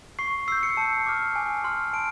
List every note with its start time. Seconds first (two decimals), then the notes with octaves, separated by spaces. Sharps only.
0.19 C#6 C7
0.48 E6 G6 C7
0.63 C#7
0.77 A5
1.06 D6 F6
1.36 G#5
1.64 C6 F6
1.93 A5 D7